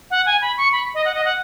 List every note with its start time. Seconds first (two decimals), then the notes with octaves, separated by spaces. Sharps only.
0.11 F#5
0.26 G#5
0.42 B5
0.58 C#6
0.72 B5
0.94 D#5
1.05 F#5
1.15 D#5
1.25 F#5